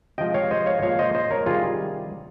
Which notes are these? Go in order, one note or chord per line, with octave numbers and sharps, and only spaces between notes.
C3 F3 G#3 D#5 G5
C#5 F5
C5 D#5
C#5 F5
A#2 F3 G#3 C#5 F5
C5 D#5
C5 D#5
A#4 C#5
C3 D#3 G3 F4 G#4